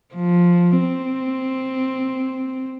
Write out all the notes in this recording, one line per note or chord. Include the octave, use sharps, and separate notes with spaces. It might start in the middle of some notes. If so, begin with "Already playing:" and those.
F3
C4